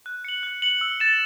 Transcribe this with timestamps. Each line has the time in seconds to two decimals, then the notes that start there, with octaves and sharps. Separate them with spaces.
0.06 F#6
0.25 C#7 F#7
0.43 F#6
0.62 C#7 F#7
0.81 E6
1.00 A6 E7